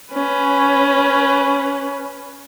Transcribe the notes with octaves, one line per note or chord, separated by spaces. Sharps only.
C#4 B4